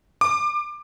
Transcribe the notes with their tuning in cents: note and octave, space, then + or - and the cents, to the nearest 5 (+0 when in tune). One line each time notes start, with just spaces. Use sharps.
D6 +25